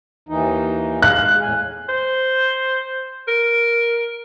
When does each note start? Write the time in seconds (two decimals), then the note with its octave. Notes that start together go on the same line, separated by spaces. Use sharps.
0.29 D#2 E3 D#4
1.02 G#3 F5 F#6
1.41 E2 A2 G#5
1.89 C5
3.28 A#4